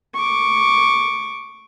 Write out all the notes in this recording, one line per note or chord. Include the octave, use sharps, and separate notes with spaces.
C#6 D6